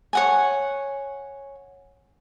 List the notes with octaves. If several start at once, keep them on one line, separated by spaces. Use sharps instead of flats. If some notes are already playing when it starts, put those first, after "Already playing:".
C#5 F#5 G#5